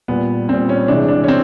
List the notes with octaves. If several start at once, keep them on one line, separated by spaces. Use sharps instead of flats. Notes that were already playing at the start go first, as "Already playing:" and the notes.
A#2 G3 B3
A#2 G3 C4
C#4
C3 E3 G#3 D4
D4
C#4
C4